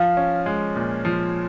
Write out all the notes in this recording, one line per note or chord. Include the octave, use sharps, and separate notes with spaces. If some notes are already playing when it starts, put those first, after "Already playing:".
Already playing: F3 F5
C#4
G#3
A#2
F3